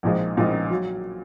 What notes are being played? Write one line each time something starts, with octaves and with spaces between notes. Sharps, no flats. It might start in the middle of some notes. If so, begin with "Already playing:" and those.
A#1 A#2 F3 G#3 D#4
A#1 A#2 F3 G#3 D#4
F#3